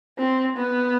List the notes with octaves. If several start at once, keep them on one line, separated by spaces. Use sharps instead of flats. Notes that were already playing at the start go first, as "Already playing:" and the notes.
C4
B3